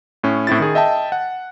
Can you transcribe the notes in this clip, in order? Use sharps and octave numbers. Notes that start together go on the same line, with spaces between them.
A2 C#4
A2 C4 E4 A6
D#3 G#4
D#5 E5 G5 A5
F#5